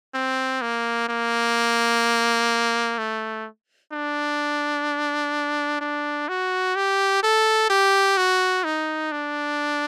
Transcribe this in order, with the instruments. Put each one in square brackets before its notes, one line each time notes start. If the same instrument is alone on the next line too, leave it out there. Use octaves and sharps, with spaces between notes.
[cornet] C4
A#3
A#3
A3
D4
D4
F#4
G4
A4
G4
F#4
D#4
D4